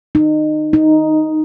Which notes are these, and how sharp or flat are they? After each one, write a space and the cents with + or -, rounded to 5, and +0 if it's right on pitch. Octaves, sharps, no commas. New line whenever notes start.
D#4 -25
D#4 +0